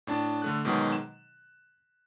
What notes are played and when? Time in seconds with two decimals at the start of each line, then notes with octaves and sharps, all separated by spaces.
0.07 A2 D4 A5
0.42 D3 A3 F#6
0.65 G#2 B2 D#3 F#3 G#3
0.92 E7